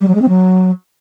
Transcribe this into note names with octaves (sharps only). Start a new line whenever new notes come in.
G3
F#3
G#3
C4
F#3